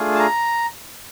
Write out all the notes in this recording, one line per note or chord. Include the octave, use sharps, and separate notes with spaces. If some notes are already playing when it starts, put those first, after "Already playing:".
Already playing: A3 D4 F4 G#4
A5
A#5